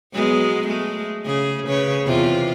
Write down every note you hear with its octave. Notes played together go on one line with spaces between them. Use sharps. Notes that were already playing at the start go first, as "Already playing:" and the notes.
F#3 G#3 B3
G#3 A3
C#3 G#4
C#3 B4 C#5
E2 C3 F4